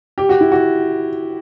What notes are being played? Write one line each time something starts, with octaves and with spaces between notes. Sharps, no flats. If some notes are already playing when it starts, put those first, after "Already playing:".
G4
F#4
E4
F#4